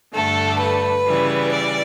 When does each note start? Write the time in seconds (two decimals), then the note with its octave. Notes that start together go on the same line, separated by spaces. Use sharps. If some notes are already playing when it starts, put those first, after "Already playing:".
0.14 G2 D3 A3 A4
0.60 B4
1.06 C#3 E3 G3
1.52 D5